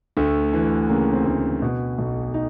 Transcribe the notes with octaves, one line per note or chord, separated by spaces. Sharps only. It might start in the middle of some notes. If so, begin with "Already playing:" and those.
D2 A3
E3
C#3 A#3
C4
D2
B2
B1
D#4